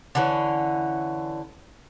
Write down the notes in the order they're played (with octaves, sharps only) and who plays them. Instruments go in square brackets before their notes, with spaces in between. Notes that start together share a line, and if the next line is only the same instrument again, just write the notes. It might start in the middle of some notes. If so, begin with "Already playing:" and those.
[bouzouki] D3 E3 C#4